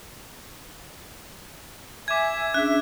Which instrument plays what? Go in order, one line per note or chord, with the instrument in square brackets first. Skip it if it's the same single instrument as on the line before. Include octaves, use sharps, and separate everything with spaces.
[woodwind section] E5 G#5 [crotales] D6 G#6
[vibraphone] C#4 D4 G#4 [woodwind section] E5 [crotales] F#6